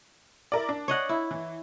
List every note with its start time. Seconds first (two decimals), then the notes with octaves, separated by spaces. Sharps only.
0.52 E4 A#4 D5
0.69 D4
0.88 C#5 D#5 F#5
1.09 E4
1.31 E3